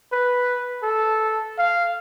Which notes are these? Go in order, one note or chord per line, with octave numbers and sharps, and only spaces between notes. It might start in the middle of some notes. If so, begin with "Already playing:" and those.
B4
A4
F5